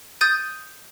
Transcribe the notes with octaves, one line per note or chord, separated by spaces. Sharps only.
D#6 G6 A6 D#7